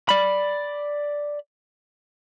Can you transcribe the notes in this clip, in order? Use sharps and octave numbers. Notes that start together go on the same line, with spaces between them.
D5 B5